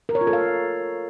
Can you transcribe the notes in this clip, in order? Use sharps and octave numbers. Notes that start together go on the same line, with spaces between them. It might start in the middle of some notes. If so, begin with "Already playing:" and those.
A#4
C#5
F4
A4
F5